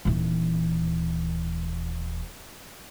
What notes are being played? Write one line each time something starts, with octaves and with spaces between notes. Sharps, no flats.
D#1 E3